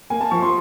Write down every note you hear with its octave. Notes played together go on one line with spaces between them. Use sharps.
A#3 G#5
A5
F3 C#6
C6